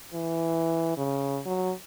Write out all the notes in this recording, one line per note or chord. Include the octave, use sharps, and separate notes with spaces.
E3
C#3
F#3